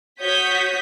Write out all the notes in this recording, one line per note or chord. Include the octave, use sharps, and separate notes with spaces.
F#4 C#5 D#6 G6 B6